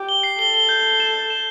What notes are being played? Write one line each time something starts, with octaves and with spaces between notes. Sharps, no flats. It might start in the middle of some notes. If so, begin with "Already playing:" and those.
Already playing: G4
G7
C7
A4 G7
G7
G6
G6
E7
G6
E7